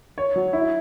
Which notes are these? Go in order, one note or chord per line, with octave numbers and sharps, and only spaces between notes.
C#5
F#3
E4